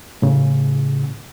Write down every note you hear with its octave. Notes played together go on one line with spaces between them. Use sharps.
A2 C#3